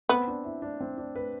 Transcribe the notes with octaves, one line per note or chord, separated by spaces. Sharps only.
B3 C4
D4
E4
D4
C4
D4
B4